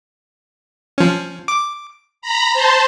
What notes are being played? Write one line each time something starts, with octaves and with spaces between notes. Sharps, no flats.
F3 C#4
D6
A#5 B5
C5 A5 C6